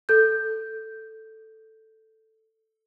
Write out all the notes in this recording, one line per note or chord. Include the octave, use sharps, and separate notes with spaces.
A4 G6